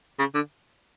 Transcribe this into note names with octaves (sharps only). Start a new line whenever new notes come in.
C#3
D3